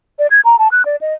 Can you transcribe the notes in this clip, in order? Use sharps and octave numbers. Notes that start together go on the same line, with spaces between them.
D5
G#6
A#5
A5
F#6
D5
D#5